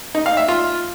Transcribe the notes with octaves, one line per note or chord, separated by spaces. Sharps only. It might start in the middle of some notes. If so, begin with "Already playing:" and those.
D#4
F5
E5
F4